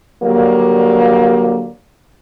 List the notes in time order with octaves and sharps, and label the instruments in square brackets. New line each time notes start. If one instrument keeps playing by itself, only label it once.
[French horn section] D3 F#3 G3 A#3